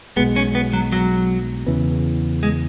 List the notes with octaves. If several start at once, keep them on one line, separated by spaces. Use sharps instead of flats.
B1 B2 G#3 B3
C#4
B3
F#3
F#3
E2 C#3 E3 B3
G#3